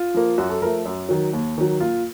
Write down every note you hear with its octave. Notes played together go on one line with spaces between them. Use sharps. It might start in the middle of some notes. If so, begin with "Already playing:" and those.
Already playing: F4
F3 A#3
F#2 F#4
A4
F3 A3 A#4
F#2
D#3 F#3
D#2
D#3 F#3
A#2 F4